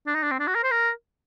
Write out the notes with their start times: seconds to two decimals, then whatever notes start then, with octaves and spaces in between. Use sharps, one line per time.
0.07 D4
0.15 D#4
0.23 D4
0.31 C4
0.40 D4
0.47 F#4
0.55 A#4
0.63 C5
0.71 A#4